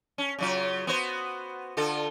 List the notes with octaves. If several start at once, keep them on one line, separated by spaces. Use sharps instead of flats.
C#4
C#3 F#3 F4
B3 F#4 C5
D3 F4 A4